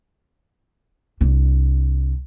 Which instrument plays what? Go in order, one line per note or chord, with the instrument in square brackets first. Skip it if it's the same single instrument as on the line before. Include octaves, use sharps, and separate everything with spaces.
[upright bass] C2 D4